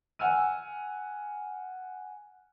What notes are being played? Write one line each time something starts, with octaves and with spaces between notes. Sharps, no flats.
F#5 G#5 E6 F6 D#7